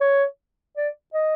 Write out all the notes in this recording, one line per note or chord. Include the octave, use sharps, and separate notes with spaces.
C#5
D5
D#5